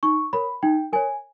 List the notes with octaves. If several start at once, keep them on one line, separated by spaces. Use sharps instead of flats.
D#4 C#6
A#4 C#5 B5
D#4 G5
A#4 C#5 G#5